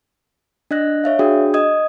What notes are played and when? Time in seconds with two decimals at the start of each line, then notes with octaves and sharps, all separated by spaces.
0.71 D4 D#5 F#6 A#6
1.04 C#5 E5 F5
1.19 D4 F#4 G#4 G5 D#6
1.54 D#5 D#6 G#6